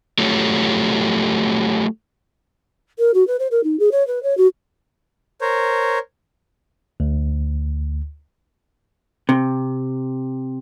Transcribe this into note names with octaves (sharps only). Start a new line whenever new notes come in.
F#3 A3 F4 G4 A4 C#5
A#4
F#4
B4
C5
A#4
D#4
G#4
C#5
B4
C#5
F#4
A#4 C5 C#5
D2
C3